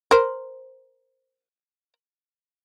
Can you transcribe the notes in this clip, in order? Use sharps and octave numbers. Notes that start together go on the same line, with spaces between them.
A#4 C5